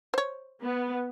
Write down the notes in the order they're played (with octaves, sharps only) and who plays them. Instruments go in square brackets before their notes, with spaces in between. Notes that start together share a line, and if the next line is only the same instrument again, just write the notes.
[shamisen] C5 C#5
[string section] B3